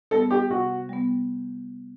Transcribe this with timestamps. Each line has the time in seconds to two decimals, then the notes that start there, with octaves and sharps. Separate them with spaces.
0.11 G3 B3 A4
0.31 G4
0.51 C3 F#4
0.89 G3 B3